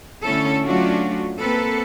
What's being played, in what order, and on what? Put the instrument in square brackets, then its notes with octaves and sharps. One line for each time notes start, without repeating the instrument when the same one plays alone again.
[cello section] D3 A3 C#4 E4 A4
F#3 A3 C#4 D4 F4 F#4
A#3 C4 A4 B4